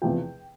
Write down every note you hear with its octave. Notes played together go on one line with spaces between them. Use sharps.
E2 C3 F3 G5